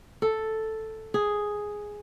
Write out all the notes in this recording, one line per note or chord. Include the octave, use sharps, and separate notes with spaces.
A4
G#4